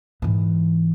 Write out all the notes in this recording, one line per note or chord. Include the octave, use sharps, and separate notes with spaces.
G#2 E3